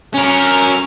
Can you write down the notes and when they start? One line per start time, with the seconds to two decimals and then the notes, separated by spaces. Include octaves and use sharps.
0.14 C#4 A#4